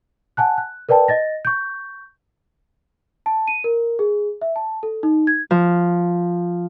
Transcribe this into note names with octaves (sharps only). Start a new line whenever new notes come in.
F#5 G#5 A5 F#6
F#6
A#4 B4 D5 G5 A5
D#5 A6 A#6
C#6 G6
A5
D#7
A#4
G#4
E5
A5
A4
D#4
G#6
F3